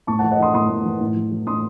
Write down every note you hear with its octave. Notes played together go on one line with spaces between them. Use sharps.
A2 A5 C#6
F#5 A5
E3
D#5 F#5
E3 C6 D#6
A2 C6 D#6
A2
E3
A2
E3
E3
A2 C6 D#6